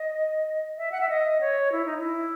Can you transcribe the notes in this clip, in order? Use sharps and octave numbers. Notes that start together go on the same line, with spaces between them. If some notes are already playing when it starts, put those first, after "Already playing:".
Already playing: D#5
E5
F#5
E5
D#5
C#5
E4
D#4
E4